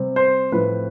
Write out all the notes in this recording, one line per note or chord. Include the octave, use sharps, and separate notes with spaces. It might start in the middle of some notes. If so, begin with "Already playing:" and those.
Already playing: C3 G3 C4
C5
A2 F3 A3 C4 B4